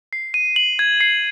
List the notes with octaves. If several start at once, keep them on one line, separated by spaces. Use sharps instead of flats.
C7
D#7
F#7
G#6
C7